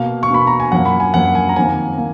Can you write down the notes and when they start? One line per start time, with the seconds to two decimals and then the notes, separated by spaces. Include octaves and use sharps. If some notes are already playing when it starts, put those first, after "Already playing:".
Already playing: B2 A#3 F5
0.23 C#6
0.30 B2 A#3 B5
0.47 A#5
0.60 G#5
0.72 F#2 F3 A#3 F#5
0.85 B5
1.00 G#5
1.14 F#2 F3 A#3 F#5
1.35 G#5
1.49 A#5
1.56 F2 D#3 A#3 G#5
1.98 A#3